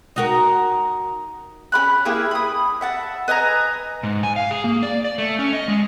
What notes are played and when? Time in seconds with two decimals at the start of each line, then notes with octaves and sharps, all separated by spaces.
0.16 D#4 F#4 A#4
1.72 C#4 G4 B5 F#6
2.05 A#3 E4 G4 G#4
2.31 B5 D#6
2.81 E5 F#5 A5
3.28 B4 D#5 G#5 A#5
4.03 G#2
4.23 G#5
4.36 F5
4.51 G#4
4.64 A#3
4.83 D5
5.05 D5
5.18 A3
5.39 C#4
5.53 D#5
5.68 G#3